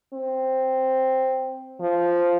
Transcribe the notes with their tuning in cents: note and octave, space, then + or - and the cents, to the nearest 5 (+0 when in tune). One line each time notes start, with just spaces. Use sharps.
C4 +0
F3 -5